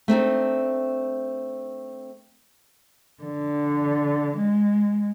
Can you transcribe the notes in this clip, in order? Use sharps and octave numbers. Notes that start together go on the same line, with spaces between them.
A3 C4 D4 D#4
D3
G#3